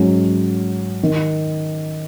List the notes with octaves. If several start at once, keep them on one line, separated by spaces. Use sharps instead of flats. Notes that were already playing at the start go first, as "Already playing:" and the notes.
Already playing: G#2 F#3 C#4
D#3